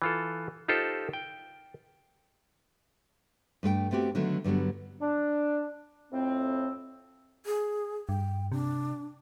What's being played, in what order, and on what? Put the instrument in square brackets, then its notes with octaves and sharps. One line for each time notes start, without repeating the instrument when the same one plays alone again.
[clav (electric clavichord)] E3 F4 A4
D#4 F4 G4 A4 C5
G5
[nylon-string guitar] G2 A3 B4 G5
A3 B3 C4 F#4 G4
D3 D#3 F#3 A3 B3
G2 D3 F#3 G3 B3
[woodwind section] D4
F2 A2 C4
[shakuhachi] G#4
[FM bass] G2 [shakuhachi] G5
[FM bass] C3 [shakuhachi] D4